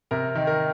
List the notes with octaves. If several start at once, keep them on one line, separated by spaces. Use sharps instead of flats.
C3 A#4
D#3
A#4